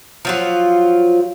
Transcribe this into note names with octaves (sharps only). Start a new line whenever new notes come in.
F3 F#3 F4